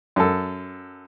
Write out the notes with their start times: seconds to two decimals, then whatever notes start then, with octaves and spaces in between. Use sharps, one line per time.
0.16 F#2 A4